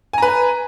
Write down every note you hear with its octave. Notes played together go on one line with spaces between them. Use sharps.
B4 G#5 A#5